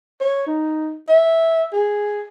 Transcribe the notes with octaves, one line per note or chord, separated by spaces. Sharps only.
C#5
D#4
E5
G#4